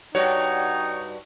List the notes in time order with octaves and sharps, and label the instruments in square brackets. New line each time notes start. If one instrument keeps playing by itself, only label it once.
[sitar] G2 F#4 D5 [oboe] D#4 [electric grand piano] C#5 [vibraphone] F#5 G5